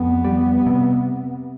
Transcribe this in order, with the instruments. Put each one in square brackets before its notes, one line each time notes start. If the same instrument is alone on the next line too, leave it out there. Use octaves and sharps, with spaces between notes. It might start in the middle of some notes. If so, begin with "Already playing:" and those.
Already playing: [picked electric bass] F2 [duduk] B3
[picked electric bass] G3
C3